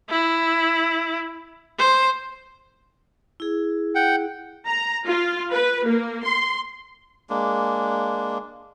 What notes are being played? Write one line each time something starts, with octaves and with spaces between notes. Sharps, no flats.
E4
C5
E4 G#4
F#5 G5
A#5
F4
B4
A#3
C6
G#3 A#3 D4